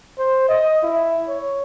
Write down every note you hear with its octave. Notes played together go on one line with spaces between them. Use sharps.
C5
D#5
E4
C#5